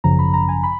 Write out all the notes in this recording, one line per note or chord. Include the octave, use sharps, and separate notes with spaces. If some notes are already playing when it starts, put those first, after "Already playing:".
G#1 F#2 C#3 F3 A#5
B5
A#5
G#5
B5